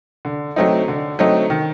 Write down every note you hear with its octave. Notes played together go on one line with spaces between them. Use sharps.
D3
F#3 A3 C4 D#4
D3
F#3 A3 C4 D#4
D#3